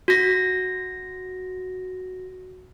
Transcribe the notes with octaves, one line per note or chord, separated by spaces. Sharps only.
F#4 A#6